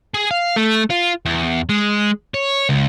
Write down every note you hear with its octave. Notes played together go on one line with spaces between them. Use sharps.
G#4
F5
A3
F4
E2
G#3
C#5
C#2